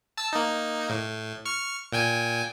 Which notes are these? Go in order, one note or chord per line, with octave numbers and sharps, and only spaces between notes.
A5 E6
A#3 D#4
A2
C#6 F6 C#7
A#2 G5 G#5